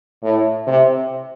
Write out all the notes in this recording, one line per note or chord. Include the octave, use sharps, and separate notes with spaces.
A2
C3